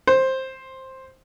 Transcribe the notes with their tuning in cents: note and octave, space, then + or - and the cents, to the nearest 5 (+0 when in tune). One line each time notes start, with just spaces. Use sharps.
C5 +10